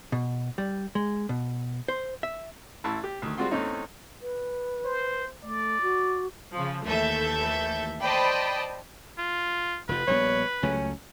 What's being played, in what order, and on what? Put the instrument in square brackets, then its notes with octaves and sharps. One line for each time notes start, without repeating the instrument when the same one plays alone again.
[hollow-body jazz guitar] B2
G3
G#3
B2
C5
E5
[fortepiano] A1 E4 A5
G4
D2 D#3
G3 G#3 C4 F4 F#4 C6
E2 A3 C4 C#4 D#4
[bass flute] B4
[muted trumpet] C5
[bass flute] A3 [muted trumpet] D5
[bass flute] F#4
[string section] C#3 F3
D#2 E3 A3 A4 E5 G6
C5 D5 D#5 G5 A5 B5
[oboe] F4
[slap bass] F1 F3 [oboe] B4
[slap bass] A#1 G3 B3 [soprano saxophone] C#5
[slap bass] C#2 F#3 A3 [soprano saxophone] C#4